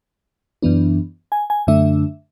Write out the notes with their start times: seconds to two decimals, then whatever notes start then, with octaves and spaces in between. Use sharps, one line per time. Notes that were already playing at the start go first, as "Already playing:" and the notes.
0.62 F#2 E3 B3 D4
1.32 G#5
1.50 G#5
1.67 F#2 D3 A3 D4 E5